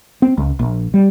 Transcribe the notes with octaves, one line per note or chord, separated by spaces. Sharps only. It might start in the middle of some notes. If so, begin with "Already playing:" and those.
C4
C#2
A#1
G3